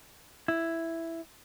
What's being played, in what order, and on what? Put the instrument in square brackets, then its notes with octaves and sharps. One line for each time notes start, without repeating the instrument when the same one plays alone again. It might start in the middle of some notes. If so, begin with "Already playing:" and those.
[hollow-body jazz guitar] E4